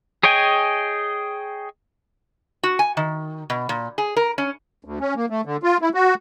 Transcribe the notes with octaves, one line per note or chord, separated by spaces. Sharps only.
G#4 C#5 D#5 G5 G#5
F#4
G#5
D#3
B2
A#2
G#4
A#4
C#4
D2
C#4
A#3
A3
D3
F4
E4
F#4